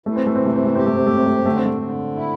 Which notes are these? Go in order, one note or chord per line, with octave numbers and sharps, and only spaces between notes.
E3 A3
C4
A3
C4
C3
A3
C4
A3
C4 G4
A3
C4
C3 A3
C4
A3
C4
D3 A3
C4
A3
D3
E4